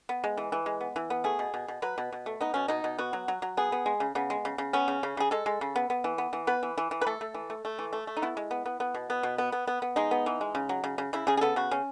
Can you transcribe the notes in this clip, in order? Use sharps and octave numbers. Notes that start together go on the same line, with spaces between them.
B3
G#3
E3
E3
G#3
B3
E3
B3
A3 G#4
B2
B2
B2
F#3 B4
B2
B2
A3
B3 D#4
B2 C#4
B2 D#4
B2
B3 F#4
F#3
F#3
F#3
B3 G#4
B3
G#3
C#3
C#3 B3
G#3
C#3
C#3
B3 C#4
C#3
C#3
C#3 G#4
G#3 A4
G#3
C#3
B3
B3
E3
B3
E3
B3 B4
E3
E3
E3
B4
A3 A4
A3
E3
A3
A3
E3
A3
A3
D#4
B3 E4
G#3
B3
B3
B3
B2
B3
B2
B3
B3
B3
B3
G#3 D#4
B3
E3
G#3
C#3
F#3
C#3
C#3
C#3 E4
C#3 G#4
G#4
B3 A4
C#3 F#4
C#3 C#4